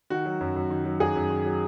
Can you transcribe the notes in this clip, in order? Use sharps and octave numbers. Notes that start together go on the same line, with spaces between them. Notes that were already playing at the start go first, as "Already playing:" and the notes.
D#3 F#4
F#3
F#2
F#2
D#3
F#3
F#2 G#4
F#2
D#3
F#3